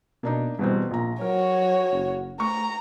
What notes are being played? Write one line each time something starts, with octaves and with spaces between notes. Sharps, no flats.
B2 A#3 D4 D#4
E2 B2 G3 C4
A#1 A#2 A#5
F#3 F#4 A#4 C#5
F#1
A3 A#5 C#6